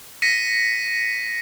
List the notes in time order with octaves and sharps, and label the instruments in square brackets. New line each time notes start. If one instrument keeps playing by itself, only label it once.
[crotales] A#6 B6 C#7 D#7